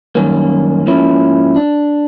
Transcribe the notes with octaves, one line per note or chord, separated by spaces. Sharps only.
F#2 D#3 G3 A#3 C#4
G#2 F3 A#3 C#4 E4
D4